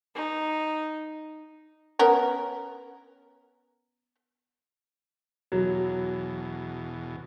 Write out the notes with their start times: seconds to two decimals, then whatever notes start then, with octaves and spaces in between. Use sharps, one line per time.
0.15 D#4
1.99 B3 C#4 A#4
5.52 E2 B2 F#3